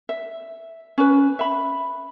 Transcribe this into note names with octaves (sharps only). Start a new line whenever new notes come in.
E5
C#4 B4
E5 B5